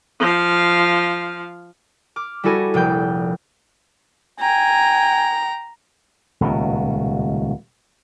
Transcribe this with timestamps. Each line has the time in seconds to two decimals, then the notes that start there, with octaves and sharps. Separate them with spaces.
0.20 F3 F5
2.16 D6 F6
2.43 G3 E4 F#4 A4 G#5 A#6
2.74 F1 A#1 G5 G6
4.40 G5 G#5 A#5
6.41 D#1 C#2 B2